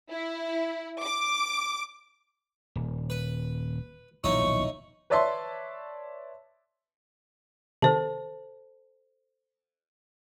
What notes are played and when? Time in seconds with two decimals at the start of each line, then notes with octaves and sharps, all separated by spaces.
0.11 E4
1.03 D6
2.76 D#1
3.10 B4
4.24 D#1 B1 F3 D#4 E4 C#5 C#6
5.10 B4 C#5 D5 E5 A5 C6
7.82 C3 D#3 A4 C5 A5